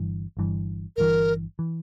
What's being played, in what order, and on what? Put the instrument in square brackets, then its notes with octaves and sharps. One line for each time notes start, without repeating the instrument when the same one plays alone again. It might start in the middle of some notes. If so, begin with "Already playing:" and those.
Already playing: [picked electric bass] G1 G2 E3
G1 G2 E3
[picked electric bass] G1 G2 E3 [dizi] A#4
[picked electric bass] E3